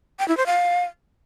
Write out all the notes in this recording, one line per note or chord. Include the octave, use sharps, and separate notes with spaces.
G5
E4
C5
F5